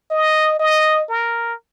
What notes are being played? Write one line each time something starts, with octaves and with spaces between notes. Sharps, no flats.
D#5
D#5
A#4